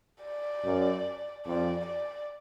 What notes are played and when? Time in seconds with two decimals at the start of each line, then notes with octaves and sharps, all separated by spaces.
0.24 D5
0.64 F#2
1.45 F2 D5
1.86 D5